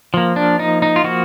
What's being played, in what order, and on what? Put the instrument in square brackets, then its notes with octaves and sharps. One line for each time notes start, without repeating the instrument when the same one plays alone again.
[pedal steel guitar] F3 A#3
D4
D#4
D#4
F4
F3 A#3 F#4